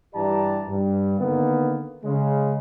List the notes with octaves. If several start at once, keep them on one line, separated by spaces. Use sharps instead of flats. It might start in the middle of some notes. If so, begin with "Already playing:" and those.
G2 E3 G4 D5 A5 A#5
G2
D3 D#3 A#3 B3
C#3 G#3